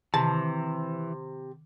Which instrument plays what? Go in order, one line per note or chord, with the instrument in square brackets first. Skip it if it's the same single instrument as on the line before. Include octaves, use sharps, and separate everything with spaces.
[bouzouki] C3 [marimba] D#3 [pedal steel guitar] E3 [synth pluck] A5